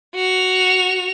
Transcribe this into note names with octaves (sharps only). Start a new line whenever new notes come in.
F#4 F7